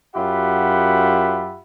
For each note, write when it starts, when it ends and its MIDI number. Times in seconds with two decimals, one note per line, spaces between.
0.15 1.62 42
0.15 1.62 65
0.15 1.62 67
0.15 1.62 76
0.15 1.62 78
0.15 1.62 83